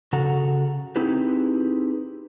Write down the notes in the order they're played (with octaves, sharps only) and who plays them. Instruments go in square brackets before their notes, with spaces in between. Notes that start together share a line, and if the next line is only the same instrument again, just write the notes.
[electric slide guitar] C#3 F#4 A4 F#5 A#5
C4 D#4 E4 G4 G#4 B4